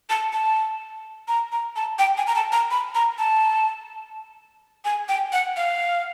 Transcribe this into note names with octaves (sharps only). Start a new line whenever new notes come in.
A5
A5
A#5
A#5
A5
G5
G#5
A#5
A5
A#5
B5
A#5
A5
G#5
G5
F#5
F5